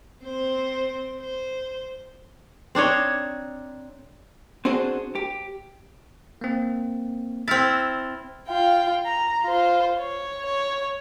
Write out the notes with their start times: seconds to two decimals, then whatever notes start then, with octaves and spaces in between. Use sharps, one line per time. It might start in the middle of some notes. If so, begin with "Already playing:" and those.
0.23 C4 C5
1.20 C5
2.75 C4 D4 D#4 C#5
4.65 C4 D4 F#4 G#4 C5
5.15 G4
6.41 A#3 C4
7.48 C4 E4 F6 A6
8.48 F4 G5
9.06 A#5
9.42 F4 C5
9.99 C#5
10.46 C#5